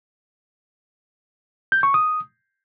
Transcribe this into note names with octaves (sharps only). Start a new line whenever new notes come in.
G6
C#6
D#6